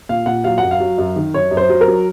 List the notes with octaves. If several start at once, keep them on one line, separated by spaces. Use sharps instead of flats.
A#2 F5
A#2 F#5
F#3 F5
F#2 F#5
F5
F#3
F#2
D#3
F#2 C#5
F#2
C5
F#3
A#4
F#3